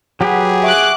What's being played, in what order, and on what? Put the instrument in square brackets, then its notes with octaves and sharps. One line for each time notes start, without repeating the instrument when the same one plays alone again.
[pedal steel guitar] F#3 G4 B4 [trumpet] G#4 [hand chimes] F#5
[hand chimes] E5 F#5 C#6 [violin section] D6 F#6